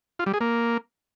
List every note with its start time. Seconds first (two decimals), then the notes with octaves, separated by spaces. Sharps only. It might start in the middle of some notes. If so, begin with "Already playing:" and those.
0.19 F4
0.26 G3
0.34 G#4
0.41 A#3